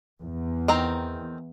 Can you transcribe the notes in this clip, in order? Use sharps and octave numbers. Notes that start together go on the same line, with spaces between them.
E2
D#3 C4 A#5